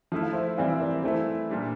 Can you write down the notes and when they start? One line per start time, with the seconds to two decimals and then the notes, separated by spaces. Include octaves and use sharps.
0.12 F3 A3 E4 E5
0.23 F5
0.33 C5 E5
0.58 E3 G3 C4 E4 D5 F5
0.73 E5
0.80 A#4 D5
1.03 E3 A3 E4 C5 E5
1.49 A#2 G3 D4